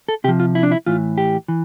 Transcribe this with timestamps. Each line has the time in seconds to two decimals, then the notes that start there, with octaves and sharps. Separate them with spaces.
0.08 A4
0.24 C3 G4
0.28 F3
0.40 F4
0.55 E4
0.63 D4
0.72 E4
0.86 A2 E3 F4
1.18 G4
1.48 E3